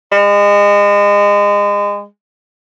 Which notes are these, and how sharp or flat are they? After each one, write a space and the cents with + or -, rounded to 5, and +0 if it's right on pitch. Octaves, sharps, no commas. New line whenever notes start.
G#3 -30